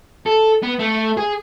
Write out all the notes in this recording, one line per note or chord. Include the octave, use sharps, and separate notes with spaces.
A4
B3
A3
G#4